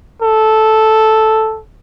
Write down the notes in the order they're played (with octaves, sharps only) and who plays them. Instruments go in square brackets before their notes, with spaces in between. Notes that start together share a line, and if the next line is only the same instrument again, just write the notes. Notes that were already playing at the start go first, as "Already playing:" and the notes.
[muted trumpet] A4